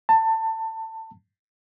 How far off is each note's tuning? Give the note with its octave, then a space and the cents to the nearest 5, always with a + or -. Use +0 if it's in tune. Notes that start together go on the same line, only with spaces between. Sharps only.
A5 +25